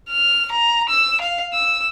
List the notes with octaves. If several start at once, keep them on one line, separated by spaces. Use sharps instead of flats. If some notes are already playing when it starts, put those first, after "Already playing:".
F6
A#5
E6
F5
E6